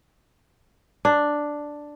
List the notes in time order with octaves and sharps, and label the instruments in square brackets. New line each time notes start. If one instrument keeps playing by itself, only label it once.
[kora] D4